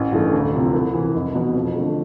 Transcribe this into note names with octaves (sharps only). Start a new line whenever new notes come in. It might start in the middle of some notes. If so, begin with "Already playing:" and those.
Already playing: A1
G2 E3 A3
D2
C3 F3
C2
C3 E3
F1
E2 B2
F2
D3 A3